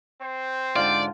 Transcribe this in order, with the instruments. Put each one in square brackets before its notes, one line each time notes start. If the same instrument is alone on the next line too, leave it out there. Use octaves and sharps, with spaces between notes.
[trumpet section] C4 C5
[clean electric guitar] G#2 D3 F4 [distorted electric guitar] D5